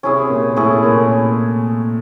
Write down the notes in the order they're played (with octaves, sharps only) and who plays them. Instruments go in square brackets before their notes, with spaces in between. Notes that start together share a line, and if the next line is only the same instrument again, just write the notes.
[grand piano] C3 C4 [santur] C#4 E4 G#4
[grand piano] A#2 A#3
[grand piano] A2 A3 [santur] C#4 E4 G#4
[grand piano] A#2 A#3